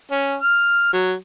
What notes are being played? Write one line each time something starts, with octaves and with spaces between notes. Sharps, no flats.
C#4
F6
F#3